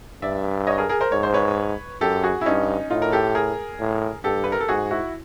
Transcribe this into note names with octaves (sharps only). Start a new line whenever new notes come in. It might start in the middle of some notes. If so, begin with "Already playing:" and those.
G2 D5 E5
C#5 D#5
G#4 A#4
G#4 A#4
A#4 C5
G#2 C#5
C5
B4 C#5
F#2 G4 A4
F#4 G#4
E4
G2 C#4 D#4
A2 D#4 F4
A#4
G4 A4
G#4 A#4
A2
G2 G4 A4
B4
A#4
A4
G#2 F#4 G#4
E4 F#4